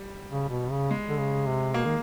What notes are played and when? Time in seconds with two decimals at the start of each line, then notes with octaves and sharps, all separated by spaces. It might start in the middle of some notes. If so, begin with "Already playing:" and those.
Already playing: G3
0.29 C#3
0.49 B2
0.71 C#3
0.91 G#3
1.09 D3
1.19 C#3
1.47 C3
1.74 B2 A#3
1.85 D#3